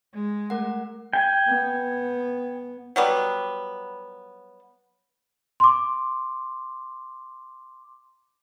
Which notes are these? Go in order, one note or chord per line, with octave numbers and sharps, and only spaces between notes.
G#3
A3 A#4 F#5
G5 G#5
B3
F#3 G3 B3
C6 D6